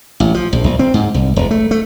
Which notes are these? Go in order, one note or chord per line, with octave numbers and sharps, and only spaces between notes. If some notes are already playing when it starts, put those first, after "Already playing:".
A1
F3
A#1
A#1
C4
G#2
C2
E1
A3
A3